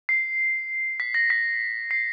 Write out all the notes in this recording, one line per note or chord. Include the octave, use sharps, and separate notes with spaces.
C7
B6
A#6
B6
C7